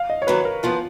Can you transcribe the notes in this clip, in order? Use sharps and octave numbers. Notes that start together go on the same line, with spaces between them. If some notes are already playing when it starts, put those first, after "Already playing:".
Already playing: F5
D#5
C#5
D#3 F#3 A#3 B4
A#4
F#2 F3 B3 F4